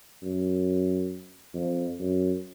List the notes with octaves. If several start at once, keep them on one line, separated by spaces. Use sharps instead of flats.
F#2
F2
F#2